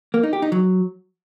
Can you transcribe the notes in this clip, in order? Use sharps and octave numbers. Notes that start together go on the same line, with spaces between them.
A#3
D#4
G4
D#4
F#3